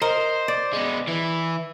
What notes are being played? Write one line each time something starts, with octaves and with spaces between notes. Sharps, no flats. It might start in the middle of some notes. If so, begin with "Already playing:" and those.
A#4 C5 D#5
D5
G#3 B3
E3 E4